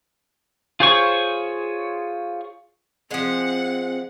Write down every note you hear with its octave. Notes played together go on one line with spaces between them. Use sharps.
F4 G#4 C5 C#5 C#6
F3 G#3 C4 F#5